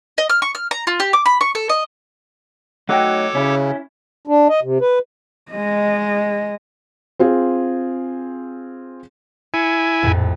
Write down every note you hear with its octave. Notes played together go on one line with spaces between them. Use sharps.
D#5
F6
C#6
F6
A#5
F4
G4
D6
B5
C#6
A4
D#5
F#3 A3 D#4 F#4 A4 C#5 G5 D6
C#3 C#4 E4
D4
D#5
C3
B4
G#3 D#5
C4 F4 G#4
E4 G#5 C#7
A#1 F2 A2